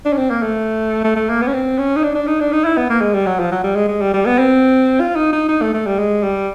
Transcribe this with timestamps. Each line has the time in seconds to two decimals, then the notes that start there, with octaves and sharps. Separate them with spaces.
0.05 D4
0.13 C#4
0.18 C4
0.30 A#3
0.42 A3
1.04 A3
1.16 A3
1.29 A#3
1.41 B3
1.47 C#4
1.54 C4
1.79 C#4
1.96 D#4
2.03 D4
2.15 D4
2.27 D#4
2.41 D4
2.53 D#4
2.65 E4
2.77 B3
2.90 A#3
3.01 G#3
3.14 G3
3.26 F#3
3.39 F3
3.52 F#3
3.64 G3
3.76 G#3
3.88 G#3
4.01 G3
4.14 G3
4.26 B3
4.38 C4
5.00 F4
5.16 D#4
5.32 D#4
5.48 D#4
5.61 A3
5.74 A3
5.86 G3
5.99 G#3
6.23 G3